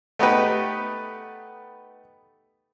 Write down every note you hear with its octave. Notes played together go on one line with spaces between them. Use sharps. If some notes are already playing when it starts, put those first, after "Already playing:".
A3 B3 D#4 G4 B4